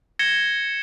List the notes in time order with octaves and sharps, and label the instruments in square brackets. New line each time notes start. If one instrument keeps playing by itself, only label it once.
[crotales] G#6 A#6 C#7 E7 G7